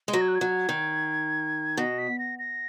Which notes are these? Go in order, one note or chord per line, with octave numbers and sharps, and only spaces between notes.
G#3
F#3 A#6
G#6
F#6
G#6
F#3
D#3
B2 A#6
B6
A#6
A#6